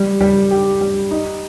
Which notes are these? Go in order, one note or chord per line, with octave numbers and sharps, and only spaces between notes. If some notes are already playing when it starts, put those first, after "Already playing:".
Already playing: G3
G3
G4
G3
D#4